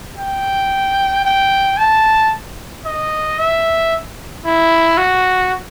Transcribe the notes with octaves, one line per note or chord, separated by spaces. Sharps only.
G5
G5
A5
D#5
E5
E4
F#4